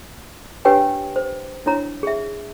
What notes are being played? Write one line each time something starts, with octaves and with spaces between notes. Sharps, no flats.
D4 G4 B4 C#5 G5 G#5
C5
D4 E4 C#5 A#5
G#4 E5